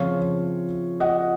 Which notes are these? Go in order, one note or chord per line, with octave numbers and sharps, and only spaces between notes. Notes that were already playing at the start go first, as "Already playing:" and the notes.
Already playing: C#3 F3 C4 C#5 F5
D#5 F#5